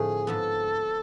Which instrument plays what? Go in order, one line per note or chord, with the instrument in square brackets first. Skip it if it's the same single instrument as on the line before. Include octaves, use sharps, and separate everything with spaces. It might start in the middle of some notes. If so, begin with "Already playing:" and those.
Already playing: [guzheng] A2 D3 F3 A3 C4 [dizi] G#4
[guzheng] G#2 F3 B3 [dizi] A4